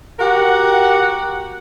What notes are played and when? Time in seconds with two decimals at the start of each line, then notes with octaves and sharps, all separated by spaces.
0.19 F#4 G4 A#4 F#5